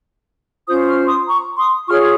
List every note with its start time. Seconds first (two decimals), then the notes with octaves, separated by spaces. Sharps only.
0.67 C#4 F4 C5 D#6 G6
0.87 C#6 F6
1.07 C6 D#6
1.27 A#5 C#6
1.57 C6 D#6
1.88 F4 G#4 C#5 C#6 F6